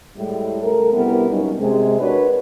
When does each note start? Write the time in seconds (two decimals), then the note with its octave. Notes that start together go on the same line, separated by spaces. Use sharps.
0.17 A2 G3 G#3
0.62 C#3 A3 A4 A#4
0.93 D2 C3 G3 B3 E4 A#4
1.30 G2 B2 F#3 G3 C#4 D#4
1.59 C3 G#3
2.00 D4 F#4 A#4 B4 C#5